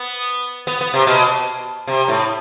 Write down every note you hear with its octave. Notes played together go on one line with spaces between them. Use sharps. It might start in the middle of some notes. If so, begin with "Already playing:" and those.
Already playing: B3
B3
B3
C3
B2
C3
A2